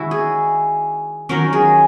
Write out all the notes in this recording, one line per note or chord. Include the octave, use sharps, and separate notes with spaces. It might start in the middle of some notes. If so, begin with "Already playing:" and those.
Already playing: D#3 G#3 C#4 E4 F#4
G#4
D#3 F#3 C#4 A#4
G#4